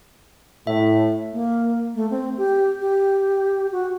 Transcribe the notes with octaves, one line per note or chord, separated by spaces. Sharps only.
A2 E5
A#3
A3
C4
G4
G4
F#4